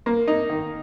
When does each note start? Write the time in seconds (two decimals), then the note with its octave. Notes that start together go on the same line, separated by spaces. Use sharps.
0.06 A#3
0.28 D#4
0.49 D#3